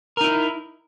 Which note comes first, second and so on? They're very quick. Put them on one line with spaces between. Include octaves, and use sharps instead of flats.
A#4 D#4 E4